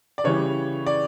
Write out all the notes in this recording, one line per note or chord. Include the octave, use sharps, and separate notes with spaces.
D5
C#3 E3 G3 C#5
D5